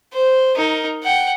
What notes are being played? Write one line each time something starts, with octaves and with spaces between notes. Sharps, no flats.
C5
D#4 A#4
F#5 G5